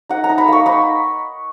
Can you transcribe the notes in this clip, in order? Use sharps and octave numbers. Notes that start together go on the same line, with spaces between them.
D#4 F#5
A#5
D#4
B5
A#3 C#6
D#4 B5